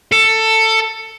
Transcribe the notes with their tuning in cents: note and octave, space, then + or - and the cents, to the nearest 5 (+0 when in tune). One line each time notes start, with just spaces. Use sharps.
A4 +15